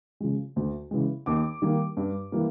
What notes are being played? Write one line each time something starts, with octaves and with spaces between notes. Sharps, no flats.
C#3 F3 G#3
D2
C#3 E3 G#3
D#2 D6
D#3 G3 A#3
G2
E3 G3 A#3